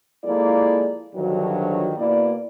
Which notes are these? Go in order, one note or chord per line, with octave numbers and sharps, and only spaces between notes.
F3 G#3 A#3 E4 A4 D5
G2 D3 D#3 F3 F#3
B2 A#3 E4 D5